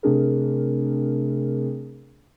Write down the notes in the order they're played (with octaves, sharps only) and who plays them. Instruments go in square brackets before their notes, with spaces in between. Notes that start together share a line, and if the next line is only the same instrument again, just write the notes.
[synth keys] C3 A3 C4 D4 G#4 A#4